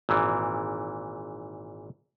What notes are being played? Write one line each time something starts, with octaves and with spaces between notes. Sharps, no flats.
G#1 A#2 E3